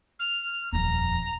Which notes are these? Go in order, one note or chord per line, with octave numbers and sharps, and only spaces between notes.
F6
D#1 F2 A#5